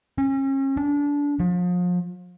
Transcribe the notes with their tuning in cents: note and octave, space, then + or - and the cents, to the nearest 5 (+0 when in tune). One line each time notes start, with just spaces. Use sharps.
C#4 -35
D4 -25
F3 +35